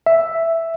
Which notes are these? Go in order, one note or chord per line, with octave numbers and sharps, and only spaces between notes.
E5